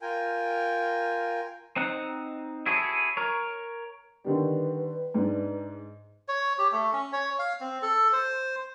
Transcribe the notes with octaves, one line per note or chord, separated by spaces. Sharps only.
F4 A#4 G5 G#5
C4 D#4 F#5
E4 F#4 G#4 A4 C#5
A#4 C#5
D3 D#3 G3 B4
G#2 D4
C#5
G4
A3
C#4
C#5
F5
C4
A4
C5